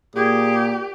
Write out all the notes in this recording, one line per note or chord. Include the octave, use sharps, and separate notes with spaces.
A#2 G4 G#4